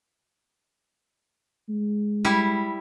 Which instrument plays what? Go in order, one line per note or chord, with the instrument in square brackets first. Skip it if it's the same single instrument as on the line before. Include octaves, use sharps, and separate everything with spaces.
[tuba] G#3
[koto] G3 E4